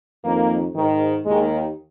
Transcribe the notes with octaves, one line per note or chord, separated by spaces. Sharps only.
F2 D#3 A#3
G#2 D#3
D#2 D#3 G#3